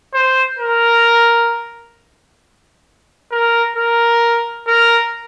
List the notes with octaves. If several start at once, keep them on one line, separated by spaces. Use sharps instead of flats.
C5
A#4
A#4
A#4
A#4